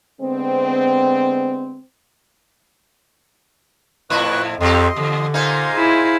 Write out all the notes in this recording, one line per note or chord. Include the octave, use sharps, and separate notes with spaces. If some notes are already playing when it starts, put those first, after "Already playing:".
D3 G#3 B3 C4
F2 A2 E4 B4 C#6 F#6
F2 F3 C4 G4 D#5 C6
E2 D3
A#2 A#3 D#4 C5 F5 G#5
E4 G#4